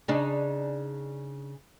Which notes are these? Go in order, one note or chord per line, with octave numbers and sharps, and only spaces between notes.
C#3 D4 D#4